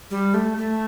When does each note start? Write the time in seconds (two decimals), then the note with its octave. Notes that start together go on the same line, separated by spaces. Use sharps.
0.10 G3
0.34 A3
0.57 A3